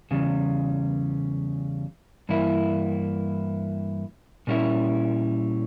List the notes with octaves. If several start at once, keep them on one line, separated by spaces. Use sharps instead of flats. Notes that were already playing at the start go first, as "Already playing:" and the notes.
E2 C#3 G3
G2 E3 A#3 E4
A#2 G3 C#4 E4